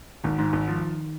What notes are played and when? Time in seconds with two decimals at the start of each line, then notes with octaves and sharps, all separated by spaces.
0.24 G#1 D#3
0.38 G#2
0.53 G#1
0.68 F3